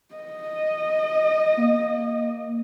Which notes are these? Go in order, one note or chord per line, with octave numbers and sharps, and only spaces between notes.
D#5
A#3